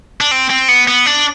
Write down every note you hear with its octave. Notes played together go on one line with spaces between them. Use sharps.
D4
C4
C4
B3
B3
D4